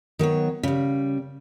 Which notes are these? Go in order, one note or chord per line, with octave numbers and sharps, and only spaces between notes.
D#3 F#3 B3 C#5
C#3 G3